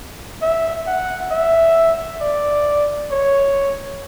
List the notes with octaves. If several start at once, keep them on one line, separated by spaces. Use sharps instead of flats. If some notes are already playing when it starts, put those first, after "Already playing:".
E5
F#5
E5
D5
C#5